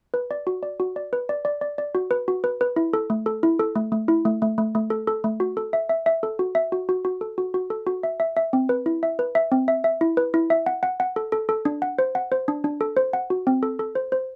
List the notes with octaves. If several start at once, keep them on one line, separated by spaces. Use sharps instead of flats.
B4
D5
F#4
D5
F#4
D5
B4
D5
D5
D5
D5
F#4
B4
F#4
B4
B4
E4
A4
A3
A4
E4
A4
A3
A3
E4
A3
A3
A3
A3
A4
A4
A3
F#4
A4
E5
E5
E5
A4
F#4
E5
F#4
F#4
F#4
A4
F#4
F#4
A4
F#4
E5
E5
E5
C4
B4
E4
E5
B4
E5
C4
E5
E5
E4
B4
E4
E5
F#5
F#5
F#5
A4
A4
A4
D4
F#5
C5
F#5
C5
D4
D4
A4
C5
F#5
F#4
C4
A4
A4
C5
C5